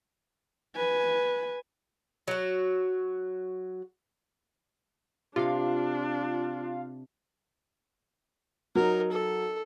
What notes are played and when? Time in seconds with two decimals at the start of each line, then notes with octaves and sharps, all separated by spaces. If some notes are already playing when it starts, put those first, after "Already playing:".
0.76 B4 G#5
2.28 F#3 F#4
5.36 C3 D4 F4 F5
8.75 F#3 D#4 A#4
9.12 A4